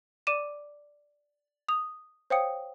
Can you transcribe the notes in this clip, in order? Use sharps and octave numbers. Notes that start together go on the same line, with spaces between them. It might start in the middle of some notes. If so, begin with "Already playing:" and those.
D5 D6 D#7 E7
D#6 F7
C5 C#5 F5 G5 D#6 C#7